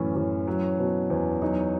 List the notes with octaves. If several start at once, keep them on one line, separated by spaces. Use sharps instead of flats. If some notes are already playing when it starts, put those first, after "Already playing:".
Already playing: F#2 A2 E3 C#4
E3
F#3
B2
E2
F#3 D#4